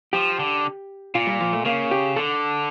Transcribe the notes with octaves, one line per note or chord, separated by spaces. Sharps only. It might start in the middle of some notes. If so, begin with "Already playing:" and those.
F3 G4
D3
A#2 F4
G3
F3
A3
C#3 A#3
G4
D3 A4